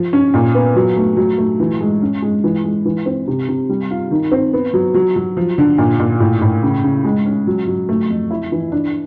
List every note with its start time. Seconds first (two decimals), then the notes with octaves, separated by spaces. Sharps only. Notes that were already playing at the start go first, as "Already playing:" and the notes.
Already playing: F3
0.13 C#4
0.34 A#2
0.55 B3
0.76 F#3
0.97 A3
1.17 F#3
1.38 A3
1.60 E3
1.80 G#3
2.02 C#4
2.22 G#3
2.44 E3
2.65 G#3
2.85 E3
3.06 C4
3.28 C3
3.49 C3
3.69 G3
3.91 F4
4.11 D#3
4.32 C4
4.53 B3
4.74 F#3
4.95 F#3
5.16 F#3
5.37 F3
5.58 D3
5.78 A#2
5.99 A#2
6.20 A2
6.41 A2
6.63 C#3
6.84 C#3
7.05 G#3
7.25 C#4
7.47 F#3
7.67 F#3
7.89 A3
8.10 F2
8.31 E4
8.52 E3
8.72 D4